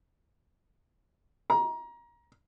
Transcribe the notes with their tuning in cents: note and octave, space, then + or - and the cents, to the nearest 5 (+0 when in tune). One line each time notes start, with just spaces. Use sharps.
A#5 +25